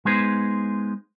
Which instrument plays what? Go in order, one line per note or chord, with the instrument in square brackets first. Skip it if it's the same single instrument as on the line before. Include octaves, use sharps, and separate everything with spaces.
[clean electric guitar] G#3 B3 D#4 G#4 B4 C5